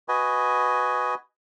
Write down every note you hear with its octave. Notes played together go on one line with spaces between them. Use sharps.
F#4 B4 D#5 G#5